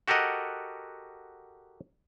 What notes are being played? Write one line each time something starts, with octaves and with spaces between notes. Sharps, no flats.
F#4 G4 A4 A#4 D#5 F#5